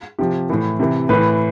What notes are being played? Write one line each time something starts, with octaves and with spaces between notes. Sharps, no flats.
C3 F3 G4
A2 E3
C3 E3
A2 E3 B4